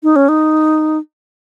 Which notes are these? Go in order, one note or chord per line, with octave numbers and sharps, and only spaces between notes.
D#4
C#4
D#4